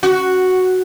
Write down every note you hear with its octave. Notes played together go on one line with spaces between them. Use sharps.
F#4